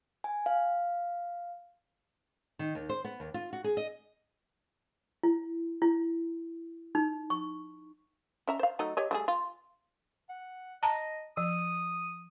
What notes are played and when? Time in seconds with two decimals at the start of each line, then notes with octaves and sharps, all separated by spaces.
0.24 G#5
0.46 F5
2.59 D#3
2.75 D#2
2.89 C5
3.04 B3
3.20 D#2
3.34 F4
3.53 F#4
3.64 G#4
3.77 D#5
5.23 E4
5.82 E4
6.95 D#4
7.30 C#6
8.47 C#4 E5 A#5
8.59 C5 F5
8.79 F#3 A3 D#4
8.97 G4 C#5 D#5
9.11 G3 A3 G#4
9.28 F4
10.29 F#5
10.83 D#5 A5 A#5
11.37 F3 D#6